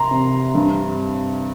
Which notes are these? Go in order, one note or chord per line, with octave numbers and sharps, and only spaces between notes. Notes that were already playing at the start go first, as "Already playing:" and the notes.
Already playing: C3 A#5 C6
C3
G2